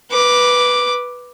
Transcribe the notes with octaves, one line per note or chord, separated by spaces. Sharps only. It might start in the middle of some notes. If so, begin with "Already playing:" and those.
B4 D6